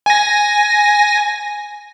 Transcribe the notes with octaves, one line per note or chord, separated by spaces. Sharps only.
G#5 A#6